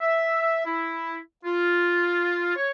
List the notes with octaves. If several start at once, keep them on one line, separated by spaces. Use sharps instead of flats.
E5
E4
F4
C#5